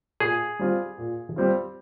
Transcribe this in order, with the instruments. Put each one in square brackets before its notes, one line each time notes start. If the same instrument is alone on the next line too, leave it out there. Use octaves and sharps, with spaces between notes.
[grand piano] A#2 [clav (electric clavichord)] G#4
[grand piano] G3 C4 F4
A#2
G3 C4 F4